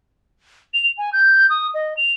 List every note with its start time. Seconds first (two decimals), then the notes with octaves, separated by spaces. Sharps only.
0.74 F7
0.98 G#5
1.13 G6
1.50 D#6
1.74 D#5
1.97 F7